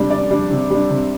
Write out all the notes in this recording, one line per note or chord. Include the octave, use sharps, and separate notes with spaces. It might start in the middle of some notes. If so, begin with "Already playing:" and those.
Already playing: C3 G3 D4
C3 D5
G3 D4
C3
G3 D4
C3